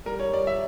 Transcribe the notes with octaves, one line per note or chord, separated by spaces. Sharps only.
G3 A#4
C#5
G3 D5
E5